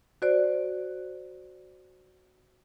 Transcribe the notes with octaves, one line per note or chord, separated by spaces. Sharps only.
F#4 C5 D5